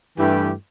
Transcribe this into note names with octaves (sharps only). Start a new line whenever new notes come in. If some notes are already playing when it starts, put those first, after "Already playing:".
G2 E3 A3 E4 G4